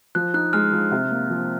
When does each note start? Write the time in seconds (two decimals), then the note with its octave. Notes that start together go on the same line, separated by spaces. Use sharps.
0.15 F3 F#6
0.34 D#4 F#6
0.53 G#3 F6
0.72 F3
0.91 C3
1.11 A#3
1.30 F3